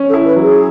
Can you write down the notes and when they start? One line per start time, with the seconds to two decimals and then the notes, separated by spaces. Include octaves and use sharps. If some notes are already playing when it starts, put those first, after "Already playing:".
Already playing: C#4
0.08 A4
0.14 E4
0.25 B4
0.36 F#3
0.42 G#4